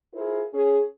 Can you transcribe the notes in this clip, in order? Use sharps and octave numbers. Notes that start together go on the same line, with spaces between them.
E4 F4 G#4 A#4 C5
C#4 G#4